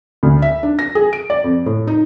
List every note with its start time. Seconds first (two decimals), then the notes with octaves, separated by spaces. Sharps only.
0.23 D2
0.42 E5
0.63 D4
0.79 A#6
0.95 G#4
1.13 D7
1.30 D5
1.44 F2
1.66 A2
1.87 D#4